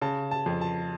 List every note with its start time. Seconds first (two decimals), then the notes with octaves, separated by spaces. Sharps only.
0.02 C#3 A5
0.31 A5
0.46 F2
0.61 A5